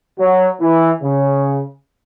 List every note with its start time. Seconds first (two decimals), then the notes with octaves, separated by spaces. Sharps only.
0.19 F#3
0.61 E3
1.02 C#3